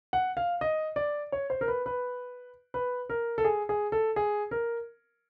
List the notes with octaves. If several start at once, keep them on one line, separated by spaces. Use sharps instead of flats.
F#5
F5
D#5
D5
C#5
C5
A#4
B4
B4
B4
A#4
A4
G#4
G#4
A4
G#4
A#4